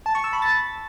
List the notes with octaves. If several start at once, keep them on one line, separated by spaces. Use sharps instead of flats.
A5
C#6
E6
B5
A6